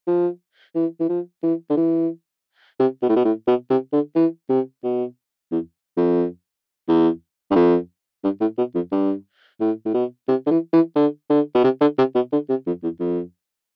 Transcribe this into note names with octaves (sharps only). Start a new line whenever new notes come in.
F3
E3
E3
F3
E3
D3
E3
C3
B2
A2
B2
A2
B2
C3
D3
E3
C3
B2
E2
F2
E2
G2
F2
G2
A2
B2
F2
G2
A2
A2
B2
C3
D3
E3
E3
D3
D3
B2
C3
D3
C3
B2
D3
C3
F2
E2
F2